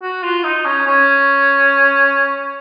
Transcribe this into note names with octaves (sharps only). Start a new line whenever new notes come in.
F#4
F4
D#4
C#4
C#4